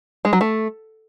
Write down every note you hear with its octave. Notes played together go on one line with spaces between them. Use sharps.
G#3
F#3
A3